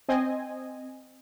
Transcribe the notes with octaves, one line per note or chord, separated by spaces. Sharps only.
C4 D#5 G#5